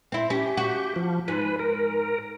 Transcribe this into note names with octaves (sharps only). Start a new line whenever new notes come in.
C4 E4
C#4 G4
F#4
F3
G#2 B4
A#4